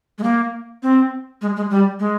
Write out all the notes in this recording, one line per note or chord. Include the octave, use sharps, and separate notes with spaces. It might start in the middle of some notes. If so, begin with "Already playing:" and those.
G#3
A#3
C4
G#3
G#3
G3
G#3